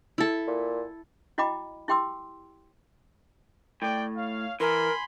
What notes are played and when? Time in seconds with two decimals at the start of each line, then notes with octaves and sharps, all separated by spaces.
0.18 E4 A4
0.47 A#2
1.38 E4 F#4 D#5 G5 B5 D6
1.88 E4 G4 G5 C6 D6 E6
3.82 A2 D5 G5
4.16 C#5 F5
4.60 E3 A#4 G#5 B5 C6